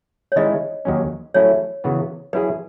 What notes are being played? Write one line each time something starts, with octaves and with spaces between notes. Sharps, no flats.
C#5
D#3 G#3 C#4 E4 D#5
D#2 D#3 F#3 C#4
F#3 A3 C#4 E4 C#5
C#3 E3 B3 F#4 B4
F#3 C#4 E4 G#4 B4